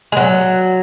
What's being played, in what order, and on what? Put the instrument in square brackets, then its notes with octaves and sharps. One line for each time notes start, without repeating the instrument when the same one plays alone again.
[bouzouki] G#3
F#3